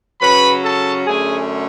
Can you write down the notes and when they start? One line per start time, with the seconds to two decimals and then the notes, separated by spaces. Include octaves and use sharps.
0.21 C#3 F#3 C#4 B4 B5
0.64 A4 A5
1.06 F#2 D3 A3 C#4 G#4 G#5